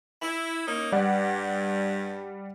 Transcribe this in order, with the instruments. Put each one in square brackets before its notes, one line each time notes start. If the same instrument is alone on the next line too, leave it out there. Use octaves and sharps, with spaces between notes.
[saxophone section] E4
A#3 C#4 D#4
[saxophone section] G2 [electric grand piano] G3 D5 F#5